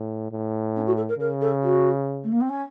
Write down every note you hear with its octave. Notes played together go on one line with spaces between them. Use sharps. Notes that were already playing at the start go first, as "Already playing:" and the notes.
Already playing: A2
A2
C#4
F#4
A4
A#4
C#3 A#4
A4
F#4
A3
A#3
C4
C#4